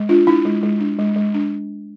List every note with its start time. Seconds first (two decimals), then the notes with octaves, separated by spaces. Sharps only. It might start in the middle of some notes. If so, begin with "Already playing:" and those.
Already playing: G#3
0.09 D4 F4
0.27 D4 E4
0.45 G#3
0.63 G#3
0.80 D4
0.99 G#3
1.16 G#3
1.34 D4